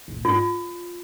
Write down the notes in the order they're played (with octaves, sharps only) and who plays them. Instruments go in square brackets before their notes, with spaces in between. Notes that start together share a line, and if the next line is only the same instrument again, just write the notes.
[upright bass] C3
A#2
[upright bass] G#2 [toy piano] F4